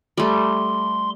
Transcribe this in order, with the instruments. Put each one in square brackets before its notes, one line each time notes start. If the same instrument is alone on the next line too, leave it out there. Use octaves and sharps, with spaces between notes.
[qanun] G3 A3 [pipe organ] C6